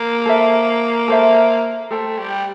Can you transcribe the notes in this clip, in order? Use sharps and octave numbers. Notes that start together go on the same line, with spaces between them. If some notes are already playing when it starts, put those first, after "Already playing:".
Already playing: A#3
A4 C5 E5
A4 C5 E5
A3 A4 C5 G5
G3